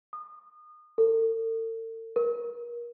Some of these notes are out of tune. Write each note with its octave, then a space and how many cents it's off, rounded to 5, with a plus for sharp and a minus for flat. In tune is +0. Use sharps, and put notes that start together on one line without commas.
D#6 -30
A4 +45
A#4 +35